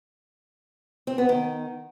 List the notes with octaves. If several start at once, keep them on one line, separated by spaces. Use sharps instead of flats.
C4
B3
D#3